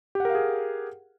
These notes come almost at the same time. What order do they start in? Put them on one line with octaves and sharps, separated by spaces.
G4 F#5 A#4 F5 G#4